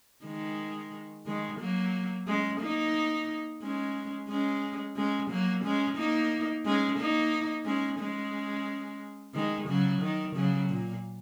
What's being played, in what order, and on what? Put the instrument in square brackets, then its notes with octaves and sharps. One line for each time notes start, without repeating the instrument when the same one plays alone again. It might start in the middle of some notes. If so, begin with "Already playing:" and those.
[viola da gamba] D#3 G#3
D#3 G#3
F#3 A#3
G#3 C#4
A#3 D#4
G#3 C#4
G#3 C#4
G#3 C#4
F#3 A#3
G#3 C#4
A#3 D#4
G#3 C#4
A#3 D#4
G#3 C#4
G#3 C#4
D#3 G#3
C#3 F#3
D#3
C#3 F#3
A#2